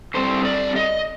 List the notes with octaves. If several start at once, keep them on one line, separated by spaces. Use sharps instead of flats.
D3 G3 C4 C5
D5
D#5